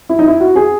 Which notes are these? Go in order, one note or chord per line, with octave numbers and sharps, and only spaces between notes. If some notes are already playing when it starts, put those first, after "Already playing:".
E4
D#4
E4
F#4
G#4